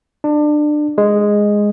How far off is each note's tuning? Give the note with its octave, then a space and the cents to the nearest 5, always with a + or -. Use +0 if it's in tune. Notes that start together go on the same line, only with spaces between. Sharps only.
D4 +25
G#3 -5